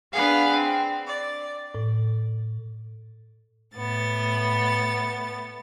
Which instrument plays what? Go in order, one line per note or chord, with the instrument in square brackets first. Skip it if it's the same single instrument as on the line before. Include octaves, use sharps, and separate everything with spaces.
[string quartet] B3 D4 G#4 B4 F5 F#5
C4
D5
[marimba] A2
[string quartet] A2 B3 A6